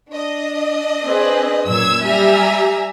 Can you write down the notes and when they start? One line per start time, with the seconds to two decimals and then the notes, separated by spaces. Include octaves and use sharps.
0.10 D4 D#5
1.05 C4 G#4 B4
1.67 F#2 A#2 E6 G#6
2.02 G3 E5 G#5 A#5